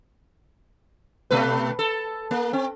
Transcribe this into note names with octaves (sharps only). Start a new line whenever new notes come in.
B2 A3 B4
A4
A#3
C4